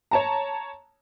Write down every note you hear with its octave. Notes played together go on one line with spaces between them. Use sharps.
C#5 A5 A#5